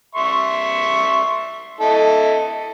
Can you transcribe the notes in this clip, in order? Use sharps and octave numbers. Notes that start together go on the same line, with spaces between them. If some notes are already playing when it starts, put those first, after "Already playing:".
E5 C6 C#6
E4 A4 D#5